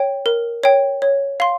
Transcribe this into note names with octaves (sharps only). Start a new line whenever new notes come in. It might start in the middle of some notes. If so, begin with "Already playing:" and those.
Already playing: C#5 G5
A#4
C#5 G5
C#5
F5 C6